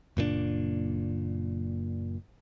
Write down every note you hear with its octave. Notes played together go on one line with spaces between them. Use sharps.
F#1 A#2 C#3 D4